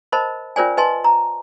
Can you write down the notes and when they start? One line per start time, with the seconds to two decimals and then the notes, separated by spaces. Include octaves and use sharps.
0.12 A#4 C5 D#5 A5 B5
0.56 C#4 F4 A#4 C5 D5 G#5
0.77 B4 D#5 G#5 A5 C6
1.04 A#5